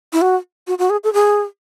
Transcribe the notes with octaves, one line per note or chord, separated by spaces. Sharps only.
E4
F#4
F#4
F#4
G#4
A4
G#4